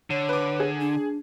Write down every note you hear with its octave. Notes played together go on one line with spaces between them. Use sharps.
D3 C#5
B4 D6
G#4
D4